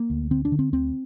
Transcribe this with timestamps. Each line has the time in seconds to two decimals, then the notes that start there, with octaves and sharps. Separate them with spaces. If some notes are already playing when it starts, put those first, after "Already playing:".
Already playing: A#3
0.10 D2
0.31 D3 C4
0.45 D4
0.52 D3
0.59 C4
0.73 D2 C4